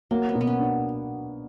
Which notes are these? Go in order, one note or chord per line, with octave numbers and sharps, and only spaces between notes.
F#3 A#3
B3
B2
B3
C#4
D4